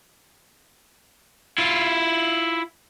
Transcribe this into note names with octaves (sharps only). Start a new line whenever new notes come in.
E4 F4